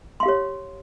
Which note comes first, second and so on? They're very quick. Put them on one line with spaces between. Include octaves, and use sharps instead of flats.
C6 F5 G4 C#5